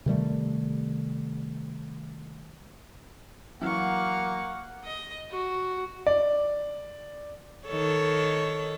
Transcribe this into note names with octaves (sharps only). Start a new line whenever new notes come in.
C3 D#3 G3 A3
E3 F#3 A#3 F5 F#5 C#6
D#5
F#4
D5
D#3 A4 C#5